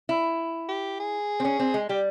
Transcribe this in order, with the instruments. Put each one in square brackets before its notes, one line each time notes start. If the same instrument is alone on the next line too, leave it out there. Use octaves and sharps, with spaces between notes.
[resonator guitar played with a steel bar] E4
[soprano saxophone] G4
G#4
[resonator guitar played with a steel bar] C4
C#4
C4
G#3
[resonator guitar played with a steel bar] G3 [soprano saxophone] G4